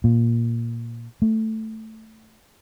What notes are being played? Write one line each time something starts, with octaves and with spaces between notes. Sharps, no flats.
A#2
A3